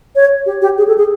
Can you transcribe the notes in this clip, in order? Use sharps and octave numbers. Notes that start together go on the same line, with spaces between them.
C#5
G4
G4
G#4
A4
G#4